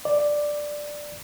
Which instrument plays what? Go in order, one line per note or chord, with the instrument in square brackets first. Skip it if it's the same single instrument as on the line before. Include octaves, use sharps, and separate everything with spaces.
[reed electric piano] D5